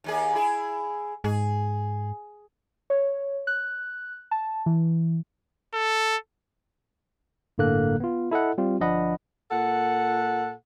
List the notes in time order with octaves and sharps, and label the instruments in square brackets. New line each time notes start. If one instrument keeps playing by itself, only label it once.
[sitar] D#2 A#3 G#4
E4 G#4
[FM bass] G#2 [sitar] G#4
[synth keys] C#5
F#6
A5
E3
[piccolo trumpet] A4
[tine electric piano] G1 A2 D3 A#3 A4 F#6
B3 F4
E4 A4 D#5 F#5
G3 C4 F4 G4
G1 F3 D4 D#5 F#5 B5
[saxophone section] A#2 A4 F#5